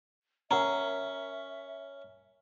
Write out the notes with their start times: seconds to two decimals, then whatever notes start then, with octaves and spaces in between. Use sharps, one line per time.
0.51 C#4 A#4 E5 F#5 A#5